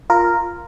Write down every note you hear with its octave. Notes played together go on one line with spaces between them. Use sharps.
F4 A#4